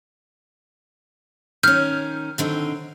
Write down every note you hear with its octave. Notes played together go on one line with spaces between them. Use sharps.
D#3 C#4 F6 G6
D3 D#3 C4